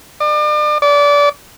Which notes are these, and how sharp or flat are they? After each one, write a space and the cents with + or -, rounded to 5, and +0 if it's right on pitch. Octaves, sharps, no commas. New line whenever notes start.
D5 +40
D5 -25